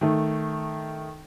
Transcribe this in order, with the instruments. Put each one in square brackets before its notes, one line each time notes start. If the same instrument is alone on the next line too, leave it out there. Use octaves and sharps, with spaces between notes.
[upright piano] D#3 A3